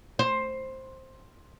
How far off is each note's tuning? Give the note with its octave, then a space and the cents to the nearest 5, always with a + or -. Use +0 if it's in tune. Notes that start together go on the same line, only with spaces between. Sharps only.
C5 +10